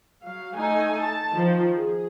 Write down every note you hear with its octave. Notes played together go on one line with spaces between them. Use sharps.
F#3 F5
A3 D#4 G#5
A5
D#3 F3
G#4